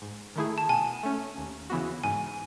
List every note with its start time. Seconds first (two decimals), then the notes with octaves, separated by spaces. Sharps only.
0.02 G#2
0.36 D#3 A3 E4 G#4
0.58 A5
0.69 B2 G#5
1.03 A3 C#4
1.37 D#2
1.70 C#3 E3 B3 F#4
2.04 G#2 G#5